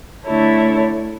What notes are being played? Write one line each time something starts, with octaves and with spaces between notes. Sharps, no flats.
D3 A3 E4 A4 C#5